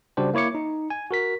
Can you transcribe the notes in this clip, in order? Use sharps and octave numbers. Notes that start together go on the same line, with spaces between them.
C#3 G3 D4 F#4 G4 C5
A#3 E4 C#5 D6 C#7
D#4
G#5
F#4 A#4 B6